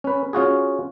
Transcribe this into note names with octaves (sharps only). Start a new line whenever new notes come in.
C#4 B4
C#4 F4 F#4 G#4